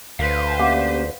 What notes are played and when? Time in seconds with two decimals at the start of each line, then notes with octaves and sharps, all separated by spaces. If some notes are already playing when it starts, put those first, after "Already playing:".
0.19 D2 B4 C5 F5
0.59 A#3 C#4 G4 F5 F#5 D6